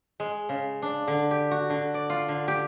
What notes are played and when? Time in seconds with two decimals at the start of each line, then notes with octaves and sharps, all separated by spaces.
0.20 G#3
0.49 C#3
0.82 D4
1.08 D3
1.31 G4
1.51 F#4
1.70 D3
1.94 D5
2.10 F4
2.28 D3
2.48 G4